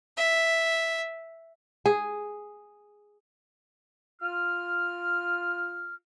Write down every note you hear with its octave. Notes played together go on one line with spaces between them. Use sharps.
E5
G#4
F4 F6